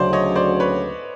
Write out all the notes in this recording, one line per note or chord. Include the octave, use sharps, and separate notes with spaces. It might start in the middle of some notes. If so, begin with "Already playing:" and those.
Already playing: D2 C#3 F#3 C5 D5
C#5 D#5
C5 D5
B4 C#5